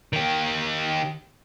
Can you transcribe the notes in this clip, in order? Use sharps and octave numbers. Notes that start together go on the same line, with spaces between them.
D#3 G4